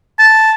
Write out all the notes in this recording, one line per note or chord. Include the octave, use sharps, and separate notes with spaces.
A5